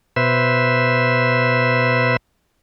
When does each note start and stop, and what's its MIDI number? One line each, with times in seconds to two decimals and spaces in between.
0.16 2.16 47
0.16 2.16 71
0.16 2.16 72
0.16 2.16 76